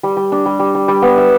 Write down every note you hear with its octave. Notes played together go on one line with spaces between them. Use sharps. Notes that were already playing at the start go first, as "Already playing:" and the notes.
G3
G3
D4
G3
G3
G3
G3
B3
E5